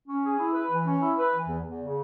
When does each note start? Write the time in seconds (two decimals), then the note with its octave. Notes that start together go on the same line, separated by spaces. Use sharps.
0.08 C#4
0.23 G#4
0.38 E4
0.54 B4
0.70 E3
0.86 C#4
1.01 E4
1.17 B4
1.32 E3
1.48 E2
1.64 E2
1.80 C#3